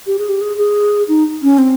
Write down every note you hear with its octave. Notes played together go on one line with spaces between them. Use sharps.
G4
G#4
G4
G#4
G#4
D#4
C#4
C4